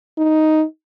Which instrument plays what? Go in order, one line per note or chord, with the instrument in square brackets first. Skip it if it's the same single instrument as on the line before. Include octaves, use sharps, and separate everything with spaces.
[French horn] D#4